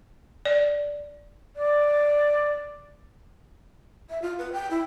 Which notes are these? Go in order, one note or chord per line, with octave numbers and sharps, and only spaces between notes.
D5
D5
E5
F4
B4
G5
E4